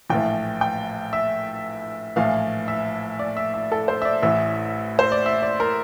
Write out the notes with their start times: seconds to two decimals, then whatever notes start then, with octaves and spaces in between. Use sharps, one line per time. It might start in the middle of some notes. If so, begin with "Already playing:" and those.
0.10 A#1 A2 E3 G5
0.61 G5
1.13 E5
2.16 A#1 A2 E3 F5
2.68 E5
3.19 D5
3.37 E5
3.54 E5
3.72 A4
3.88 C5
4.02 E5
4.05 D5
4.22 A1 A2 E3 E5
4.99 C5
5.12 D5
5.26 E5
5.43 D5
5.60 A#4